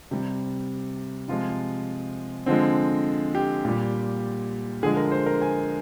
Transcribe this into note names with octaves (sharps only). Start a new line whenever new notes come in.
C3 G3 G4
C3 F3 G#3 F4
D3 F3 G#3 C4
G4
A#2 G3
D3 F3 G#3 G#4
A#4
C5
A#4
G#5